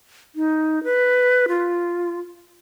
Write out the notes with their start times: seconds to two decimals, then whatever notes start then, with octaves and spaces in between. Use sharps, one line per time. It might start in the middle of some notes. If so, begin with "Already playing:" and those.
0.35 D#4
0.84 B4
1.48 F4